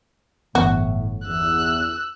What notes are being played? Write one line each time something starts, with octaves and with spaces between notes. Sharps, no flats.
G1 A2 E3 B3 F#4
E2 E6 F#6